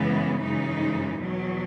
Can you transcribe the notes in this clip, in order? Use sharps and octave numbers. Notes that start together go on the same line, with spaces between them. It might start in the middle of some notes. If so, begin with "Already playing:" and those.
Already playing: F#2 C#3 E3 G#3 B3
F#2 C#3 E3 G#3 D#4
E2 B2 F#3